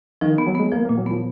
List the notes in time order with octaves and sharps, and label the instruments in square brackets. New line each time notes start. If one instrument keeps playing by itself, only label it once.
[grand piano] D#3 [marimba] F3
[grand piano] D#3
[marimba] B3
[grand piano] F#3
[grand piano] G#3 [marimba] B3
[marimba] F3 [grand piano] A#3
[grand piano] A#3
[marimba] A#2
[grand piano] F#3
[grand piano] F3 [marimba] B3